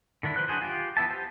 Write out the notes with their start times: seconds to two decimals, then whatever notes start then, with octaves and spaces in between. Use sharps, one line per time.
0.23 D3 D#3 D4 E4
0.36 F3 B4 C5 F#6
0.48 F#3 D4 F#4 G#4 C5
0.62 F4 G4
0.97 E3 B3 E5 A5
1.10 G4 C5